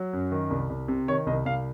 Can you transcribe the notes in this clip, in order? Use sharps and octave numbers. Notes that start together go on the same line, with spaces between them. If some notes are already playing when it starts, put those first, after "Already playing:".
Already playing: F#3
F#2
D#3
C2
C2
C3
D#3 C#5
C2 D#5
C2 F5